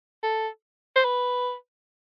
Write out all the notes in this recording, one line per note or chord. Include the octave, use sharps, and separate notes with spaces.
A4
C5
B4